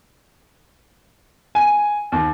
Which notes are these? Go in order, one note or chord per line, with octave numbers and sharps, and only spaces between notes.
G#5
D#2